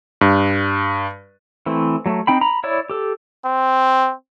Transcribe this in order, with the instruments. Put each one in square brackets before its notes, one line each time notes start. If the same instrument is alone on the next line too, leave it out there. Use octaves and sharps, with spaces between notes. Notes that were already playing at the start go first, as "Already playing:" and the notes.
[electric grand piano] G2
[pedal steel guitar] E3 A3 C4
F#3 A3
C4 D#4 G5 B5
A#5 B5
E4 C#5 D5 E5
G4 A4
[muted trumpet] C4